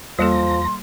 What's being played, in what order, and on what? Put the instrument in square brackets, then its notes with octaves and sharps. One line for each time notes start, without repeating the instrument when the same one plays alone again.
[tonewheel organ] E2 A#5 A#6 [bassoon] F3 [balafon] G3 A#3 A4 [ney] C6